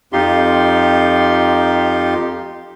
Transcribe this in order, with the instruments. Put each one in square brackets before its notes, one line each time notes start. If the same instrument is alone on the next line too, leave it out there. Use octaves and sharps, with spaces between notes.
[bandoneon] F2 D#4 F4 G4 C6